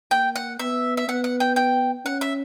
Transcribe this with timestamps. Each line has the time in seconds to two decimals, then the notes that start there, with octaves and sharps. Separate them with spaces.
0.11 A#3 G5
0.36 F#5
0.59 B3 E5
0.97 E5
1.08 B3 F#5
1.24 F#5
1.40 G5
1.56 G5
2.05 C#4 F#5
2.21 E5